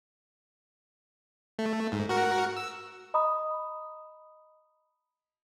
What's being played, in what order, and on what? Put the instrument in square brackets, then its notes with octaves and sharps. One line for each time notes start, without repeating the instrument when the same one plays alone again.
[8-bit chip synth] A3
G#2
F#4 A#4 F#5
E6
[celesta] D#5 A#5 B5 D#6